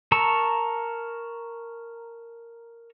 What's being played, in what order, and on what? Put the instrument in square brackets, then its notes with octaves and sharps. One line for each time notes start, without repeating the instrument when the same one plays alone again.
[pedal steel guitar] A#4 A5 A#5 C#6 E6